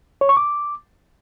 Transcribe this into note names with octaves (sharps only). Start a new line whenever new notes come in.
C#5
C#6
D6